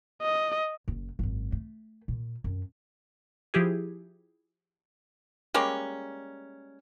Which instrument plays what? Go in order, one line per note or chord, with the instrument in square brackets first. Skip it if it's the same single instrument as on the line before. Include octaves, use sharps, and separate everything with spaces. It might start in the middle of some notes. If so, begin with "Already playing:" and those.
[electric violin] D#5
[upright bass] F#1
G#1 F#2
A3
A#2
F#2
[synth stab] F3 E4 G4 G#4
[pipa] G3 G#3 A#3 C#4